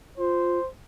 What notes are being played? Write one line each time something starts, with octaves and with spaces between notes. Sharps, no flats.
F4 C5